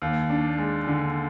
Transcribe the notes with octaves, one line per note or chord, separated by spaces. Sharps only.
D#2
D4
G#3
D3